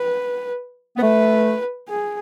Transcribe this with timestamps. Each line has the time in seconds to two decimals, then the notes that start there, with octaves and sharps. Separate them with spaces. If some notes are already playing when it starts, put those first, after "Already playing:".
Already playing: B4
0.96 B3
1.02 A3 B4
1.89 G#4